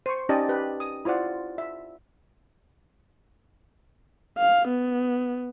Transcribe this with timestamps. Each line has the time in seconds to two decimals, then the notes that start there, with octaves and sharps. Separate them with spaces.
0.06 C5 C#6
0.29 C#4 D#4 G4 D5 D#5 A5
0.49 G4 B4
0.80 D#6
1.05 E4 F4 C5 D5 F#5
1.58 E5
4.38 F5
4.68 B3